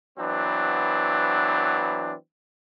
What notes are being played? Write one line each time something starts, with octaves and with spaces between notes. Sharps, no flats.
E3 F#3 B3 C4 D4